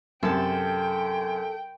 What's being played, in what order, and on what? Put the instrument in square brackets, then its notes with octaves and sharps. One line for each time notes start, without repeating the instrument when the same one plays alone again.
[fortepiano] F#2 C3 [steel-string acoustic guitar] A4 A5 [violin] G5